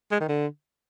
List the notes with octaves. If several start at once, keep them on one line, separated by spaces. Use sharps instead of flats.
G#3
D#3
D3